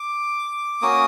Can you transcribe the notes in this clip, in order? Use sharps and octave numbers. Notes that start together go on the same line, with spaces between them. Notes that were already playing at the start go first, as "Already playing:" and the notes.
Already playing: D6
A#3 C#4 F#4 D#6